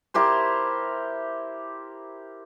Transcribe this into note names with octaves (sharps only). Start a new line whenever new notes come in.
E4 G4 A#4 C5